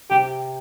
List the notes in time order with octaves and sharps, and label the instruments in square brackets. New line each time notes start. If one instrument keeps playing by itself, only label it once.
[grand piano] C3 [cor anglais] G4